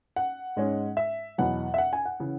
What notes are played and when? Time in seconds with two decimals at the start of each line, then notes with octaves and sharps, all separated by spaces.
0.16 F#5
0.56 G#2 G#3 C#4
0.97 E5
1.38 E2 B2 F#3 B3 F#5
1.74 E5
1.78 F#5
1.93 G#5
2.05 F#5
2.20 C#3 E3 C#4